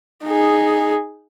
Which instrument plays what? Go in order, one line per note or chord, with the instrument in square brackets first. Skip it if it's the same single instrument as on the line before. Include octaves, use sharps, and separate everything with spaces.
[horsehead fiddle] D#4 G#4